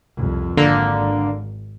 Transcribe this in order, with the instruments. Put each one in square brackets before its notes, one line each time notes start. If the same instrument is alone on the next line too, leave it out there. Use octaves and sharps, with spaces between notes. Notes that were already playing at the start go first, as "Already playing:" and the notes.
[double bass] C2 F2
[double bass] G#1 [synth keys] D3 A#3